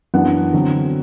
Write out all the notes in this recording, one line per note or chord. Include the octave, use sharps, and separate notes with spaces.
F#2 E3 B3 D4 F#5
D3 F#3 C4